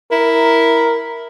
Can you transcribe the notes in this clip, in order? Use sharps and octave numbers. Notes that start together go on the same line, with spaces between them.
E4 A#4